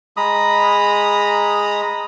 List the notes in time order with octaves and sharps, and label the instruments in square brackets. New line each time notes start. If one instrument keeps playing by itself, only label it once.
[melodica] G#3 A#5 B5 D#6